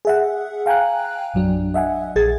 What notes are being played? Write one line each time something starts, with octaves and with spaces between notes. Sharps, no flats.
G#4 E5 F#5
F5 G5 G#5 A#5 F#6
A#1 F#2 F#3 D4
D#5 E5 F#5 G#5
A#1 G#4 G#6 A6